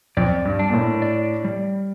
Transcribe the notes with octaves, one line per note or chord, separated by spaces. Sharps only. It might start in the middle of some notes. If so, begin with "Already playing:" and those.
F2 D5
G2
D4
A#2
A2
D5
G3